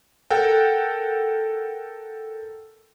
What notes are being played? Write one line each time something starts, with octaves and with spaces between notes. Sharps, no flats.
A4 A#4 F#5 G5